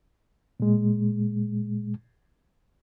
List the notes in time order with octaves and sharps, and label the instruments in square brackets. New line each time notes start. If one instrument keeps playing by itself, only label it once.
[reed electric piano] A#2 G#3